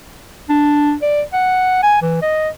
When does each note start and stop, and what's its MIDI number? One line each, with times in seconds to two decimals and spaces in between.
0.49 0.94 62
1.02 1.22 74
1.33 1.80 78
1.83 1.97 80
2.02 2.18 52
2.22 2.49 75